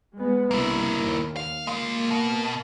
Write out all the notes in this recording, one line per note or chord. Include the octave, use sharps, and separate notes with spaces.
G#3 B3
C2 A#3 E4
D#2
F5
G#3 A#3 F5
B2